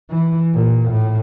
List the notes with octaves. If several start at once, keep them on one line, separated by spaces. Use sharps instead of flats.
E3
A#2
A2